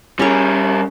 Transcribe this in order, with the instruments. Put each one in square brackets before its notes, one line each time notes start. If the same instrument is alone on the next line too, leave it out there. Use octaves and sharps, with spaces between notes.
[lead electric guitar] G3 A#4 [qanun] C#4 G#4 C#5